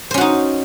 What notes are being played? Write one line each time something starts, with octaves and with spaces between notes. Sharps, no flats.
C#4 D#4 F#4 C5